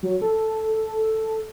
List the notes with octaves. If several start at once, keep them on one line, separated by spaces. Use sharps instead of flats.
F#3
A4